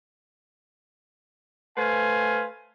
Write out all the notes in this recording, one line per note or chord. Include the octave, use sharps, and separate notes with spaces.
A3 B4 C5 F5 G#5